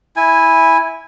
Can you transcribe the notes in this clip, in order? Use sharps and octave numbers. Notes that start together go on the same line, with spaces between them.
E4 G#5